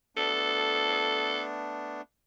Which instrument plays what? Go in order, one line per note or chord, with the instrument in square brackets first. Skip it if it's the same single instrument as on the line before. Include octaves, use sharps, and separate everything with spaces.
[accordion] A3 B3 D4 [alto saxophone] A4